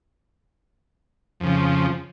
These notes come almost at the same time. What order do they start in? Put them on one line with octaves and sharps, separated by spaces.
F2 C#3 F3